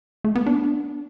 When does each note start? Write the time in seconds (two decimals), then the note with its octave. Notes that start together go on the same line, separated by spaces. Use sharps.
0.24 A3
0.35 B3
0.46 D4